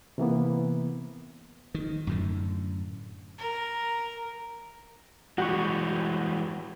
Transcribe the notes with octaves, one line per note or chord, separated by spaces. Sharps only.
C3 E3 A#3 B3
D#3
F#2 A2 D3
A#4
E3 G3 G#3 F#4 G4 C#6